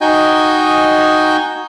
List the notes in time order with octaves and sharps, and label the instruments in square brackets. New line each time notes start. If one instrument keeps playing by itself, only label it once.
[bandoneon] D#4 F#4 D#5 G5 G#5 G6